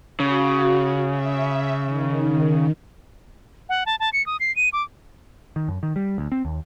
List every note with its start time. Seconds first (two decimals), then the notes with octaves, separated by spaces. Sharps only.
0.20 C#3 F#4
1.09 E5
1.84 D#3
3.69 F#5
3.86 A5
4.00 A5
4.13 C#7
4.26 D#6
4.40 C7
4.56 D#7
4.73 D6
5.56 D#3
5.68 F#2
5.83 D#3
5.96 G3
6.18 D2
6.32 C4
6.45 D#2